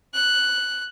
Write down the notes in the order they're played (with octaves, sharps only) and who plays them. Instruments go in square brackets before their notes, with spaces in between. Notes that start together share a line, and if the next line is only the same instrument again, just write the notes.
[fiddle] F#6